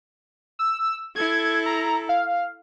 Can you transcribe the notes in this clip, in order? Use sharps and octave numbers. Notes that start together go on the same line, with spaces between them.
E6
E4 A4 G#6
A#5
F5